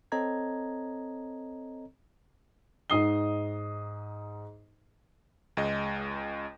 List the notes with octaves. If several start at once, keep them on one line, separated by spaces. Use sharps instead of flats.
C4 A4 C#5 D#5 A#5 G#6
G#2 D#4 D#6 C7 G7
C#2 G#3 D#5